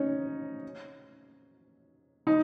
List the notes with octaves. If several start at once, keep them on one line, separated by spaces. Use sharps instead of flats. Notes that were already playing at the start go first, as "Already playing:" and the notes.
Already playing: C#4 D#4
D#4